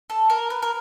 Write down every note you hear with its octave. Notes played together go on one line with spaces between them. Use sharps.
A4
A#4
B4
A#4